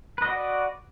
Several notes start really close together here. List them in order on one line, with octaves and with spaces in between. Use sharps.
B4 D#5 F#4 D5